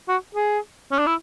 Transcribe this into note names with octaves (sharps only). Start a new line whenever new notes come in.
F#4
G#4
C#4
D4
E4